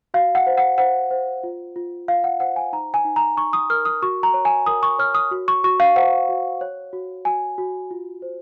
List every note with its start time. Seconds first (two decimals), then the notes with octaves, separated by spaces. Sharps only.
0.14 F#4 F5
0.35 F#5
0.47 C5
0.58 F#5
0.78 C5 F#5
1.11 C5
1.44 F4
1.76 F4
2.08 F4 F5
2.24 F#5
2.40 C5 F#5
2.56 G#5
2.73 D#4 A#5
2.94 G#5
3.05 D#4
3.16 A#5
3.37 D#4 C#6
3.53 D#6
3.70 A#4 F6
3.85 D#6
4.02 F#4 C#6
4.23 A#5
4.34 C#5
4.45 G#5
4.66 A#4 D#6
4.83 C#6
4.99 C#5 F6
5.15 D#6
5.31 F#4
5.48 C#6
5.64 F#4 C#6
5.80 F5
5.96 C5 F#5
6.29 F#4
6.61 C#5
6.93 F#4
7.25 F#4 G#5
7.58 F#4
7.91 F4
8.22 C5